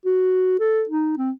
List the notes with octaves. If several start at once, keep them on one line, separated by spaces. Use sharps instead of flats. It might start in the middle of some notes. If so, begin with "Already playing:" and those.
F#4
A4
D#4
C4